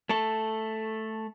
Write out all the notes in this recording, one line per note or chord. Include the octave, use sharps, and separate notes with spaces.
A3 A4